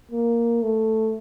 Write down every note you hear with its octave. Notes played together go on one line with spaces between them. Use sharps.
A#3
A3